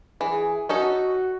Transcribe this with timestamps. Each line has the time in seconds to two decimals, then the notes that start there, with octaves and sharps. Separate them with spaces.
0.21 E3 G#4
0.69 C#4 D#4 F#4 A4